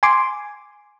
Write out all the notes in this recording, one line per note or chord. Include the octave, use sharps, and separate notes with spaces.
G#5 C6 D6